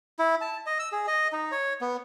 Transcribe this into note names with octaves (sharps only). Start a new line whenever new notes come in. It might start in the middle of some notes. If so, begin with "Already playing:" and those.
E4
A5
D#5
E6
G#4
D#5
D#4
C#5
B3